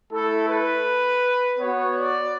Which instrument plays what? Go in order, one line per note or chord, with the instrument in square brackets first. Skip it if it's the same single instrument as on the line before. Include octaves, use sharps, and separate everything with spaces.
[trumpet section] A3 E4 A4
B4
B3 F#4 C#5
D5